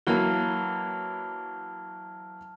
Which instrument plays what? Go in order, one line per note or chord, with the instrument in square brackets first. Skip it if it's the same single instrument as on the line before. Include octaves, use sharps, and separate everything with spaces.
[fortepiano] E3 F#3 A#3 [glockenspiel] A5 F6 G7